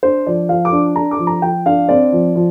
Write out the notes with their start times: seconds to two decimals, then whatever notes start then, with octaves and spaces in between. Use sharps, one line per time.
0.03 D4 C5
0.26 F3 D5
0.49 F3 F5
0.65 D6
0.72 D4
0.96 D4 A#5
1.11 D6
1.19 F3
1.27 A#5
1.42 F3 G5
1.66 D4 F5
1.89 C4 D5
2.12 F3
2.35 F3